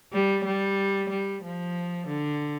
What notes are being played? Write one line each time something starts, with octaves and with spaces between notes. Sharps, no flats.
G3
G3
G3
F3
D3